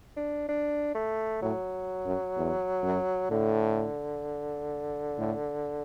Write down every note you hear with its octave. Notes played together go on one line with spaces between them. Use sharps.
D4
D4
A3
A2 F#3
F#2
E2
F#2
A2 D3
A2